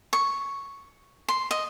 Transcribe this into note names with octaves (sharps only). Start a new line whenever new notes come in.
C#6
C6
D#5